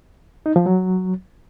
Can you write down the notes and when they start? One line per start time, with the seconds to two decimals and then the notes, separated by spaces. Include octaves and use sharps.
0.46 D#4
0.56 F3
0.66 F#3